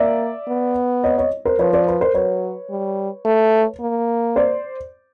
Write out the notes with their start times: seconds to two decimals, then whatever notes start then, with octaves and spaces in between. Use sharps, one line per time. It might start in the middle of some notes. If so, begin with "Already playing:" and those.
Already playing: A#3 D5 E5
0.48 B3
1.04 C#5 D#5
1.18 C#5 D#5
1.45 A#4 C5
1.59 F3 B4 C#5
1.73 C5 D5
1.88 B4
2.01 A#4 C5
2.15 F#3 B4 C#5
2.70 G3
3.25 A3
3.81 A#3
4.36 C5 D5